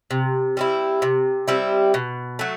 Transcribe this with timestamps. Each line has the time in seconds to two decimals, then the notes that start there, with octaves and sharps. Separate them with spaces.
0.11 C3
0.57 G3 C4 E4
1.02 C3
1.48 G3 C4 E4
1.94 B2
2.39 F#3 A3